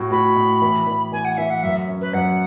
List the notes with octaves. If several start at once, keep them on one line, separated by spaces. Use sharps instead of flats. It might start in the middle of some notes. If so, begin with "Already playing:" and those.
Already playing: A2 F#4
F#4 B5
A2
E3
E3
E3 G#5
F#5
E3 E5
F#5
F#2 E5
C#4
B4
F#2 F#5